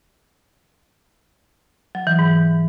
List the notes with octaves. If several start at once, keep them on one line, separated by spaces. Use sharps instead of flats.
F#3
E3
G#2